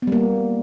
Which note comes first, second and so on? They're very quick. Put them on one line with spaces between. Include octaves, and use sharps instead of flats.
B3 G3 A#3